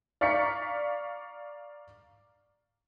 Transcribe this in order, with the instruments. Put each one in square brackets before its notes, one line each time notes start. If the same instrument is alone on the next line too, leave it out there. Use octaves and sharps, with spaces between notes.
[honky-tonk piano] D5 F5 A#5 C#6 B6 C#7